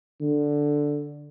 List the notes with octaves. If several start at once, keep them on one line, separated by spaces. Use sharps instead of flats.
D3